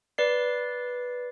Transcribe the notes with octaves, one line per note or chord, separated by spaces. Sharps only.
B4 D5 C7